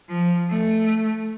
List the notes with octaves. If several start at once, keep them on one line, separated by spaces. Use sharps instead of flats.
F3
A3